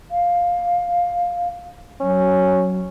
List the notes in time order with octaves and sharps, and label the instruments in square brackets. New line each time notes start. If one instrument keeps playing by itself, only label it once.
[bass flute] F5
[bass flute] F#3 [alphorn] C#4